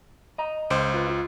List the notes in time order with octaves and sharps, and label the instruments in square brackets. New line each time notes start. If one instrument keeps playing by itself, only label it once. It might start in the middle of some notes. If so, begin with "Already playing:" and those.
[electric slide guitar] D#5 A#5
[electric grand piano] C#2 C5
[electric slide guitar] F4 B4
F4